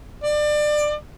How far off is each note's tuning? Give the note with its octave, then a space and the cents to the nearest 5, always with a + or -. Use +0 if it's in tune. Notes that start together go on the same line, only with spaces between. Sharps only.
D5 +25